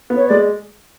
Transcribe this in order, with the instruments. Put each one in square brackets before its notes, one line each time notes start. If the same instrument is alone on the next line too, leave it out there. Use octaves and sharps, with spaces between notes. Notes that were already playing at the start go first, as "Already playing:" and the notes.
[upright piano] B3
[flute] C#5
[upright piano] G#3 [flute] D5